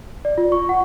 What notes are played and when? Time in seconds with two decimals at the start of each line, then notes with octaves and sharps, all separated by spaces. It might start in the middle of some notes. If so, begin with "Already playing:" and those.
0.25 D5
0.38 F4
0.52 C#6
0.69 F#5